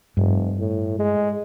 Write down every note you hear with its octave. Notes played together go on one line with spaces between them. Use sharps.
F1 G2
A2
G#3